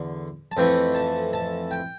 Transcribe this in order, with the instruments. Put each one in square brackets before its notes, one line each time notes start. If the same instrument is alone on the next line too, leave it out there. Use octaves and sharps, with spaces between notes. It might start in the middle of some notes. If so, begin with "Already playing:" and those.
Already playing: [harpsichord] E2 D3
A5
F2 E3 A3 G5
A5
A5
G5